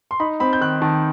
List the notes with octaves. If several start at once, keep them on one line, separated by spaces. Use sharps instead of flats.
C6
D#4 B5
C4 B5
G6
D#3 F#6
D#3 A5